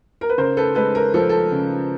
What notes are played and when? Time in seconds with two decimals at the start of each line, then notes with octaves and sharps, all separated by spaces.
0.21 A#4
0.29 B4
0.38 C#3 A#4 C5
0.57 A4 B4
0.75 G#3 A4 B4
0.95 A#4
1.14 F3 A4
1.29 A4
1.52 C#3